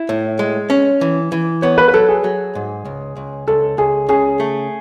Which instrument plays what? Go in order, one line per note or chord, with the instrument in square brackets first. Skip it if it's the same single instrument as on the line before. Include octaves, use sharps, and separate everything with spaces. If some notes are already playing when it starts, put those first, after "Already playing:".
Already playing: [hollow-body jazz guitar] E4
A2
G#3
C#4
E3
E3
[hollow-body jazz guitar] B3 [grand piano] C#5
[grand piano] B4
B4
[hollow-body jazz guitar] F#3 [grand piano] A4
[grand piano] G#4
[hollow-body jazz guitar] F#3
G#2
C#2
C#2
[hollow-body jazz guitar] C#2 [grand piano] A4
[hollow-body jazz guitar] C#2 [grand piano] G#4
[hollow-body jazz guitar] C#3 [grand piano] G#4
[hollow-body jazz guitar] A3